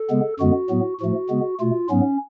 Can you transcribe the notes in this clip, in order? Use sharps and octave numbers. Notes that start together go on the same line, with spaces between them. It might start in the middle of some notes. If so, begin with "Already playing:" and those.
Already playing: A4
C#3 G#3 B3
F#2 D3 G#3 B3 F#4
A2 F#3 B3
A2 F3 A3 F#4
C#3 G#3 B3
B2 A3 F4
G#2 F#3 B3 C#4